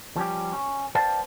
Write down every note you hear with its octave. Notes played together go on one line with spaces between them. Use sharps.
F3 G3 C#4 G4
C#4
B4 C5 D5 F5 G5 A5